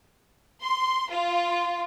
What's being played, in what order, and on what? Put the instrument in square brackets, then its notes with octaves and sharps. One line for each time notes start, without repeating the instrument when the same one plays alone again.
[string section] C6
F4